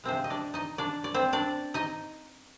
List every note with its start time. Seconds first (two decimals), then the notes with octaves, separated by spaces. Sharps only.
0.04 C3 F3 G#3 C4 D4 C5
0.24 D#5
0.30 D4 D5
0.54 D#4 D#5
0.78 D4 D5
1.04 D5
1.14 C4 C5
1.33 D4 D5
1.74 D#4 D#5